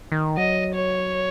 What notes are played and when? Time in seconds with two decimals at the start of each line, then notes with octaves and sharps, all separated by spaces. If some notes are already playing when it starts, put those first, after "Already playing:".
0.12 D#3
0.37 F#3 D#5
0.75 C#5